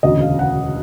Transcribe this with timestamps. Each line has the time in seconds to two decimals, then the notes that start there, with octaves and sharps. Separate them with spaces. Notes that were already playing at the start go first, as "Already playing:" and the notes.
0.03 E1 D2 C#3 D#5
0.21 F5
0.39 F#5